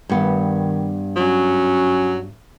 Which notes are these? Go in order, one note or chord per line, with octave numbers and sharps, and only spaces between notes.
G2 D#3 B3
F#3 C#4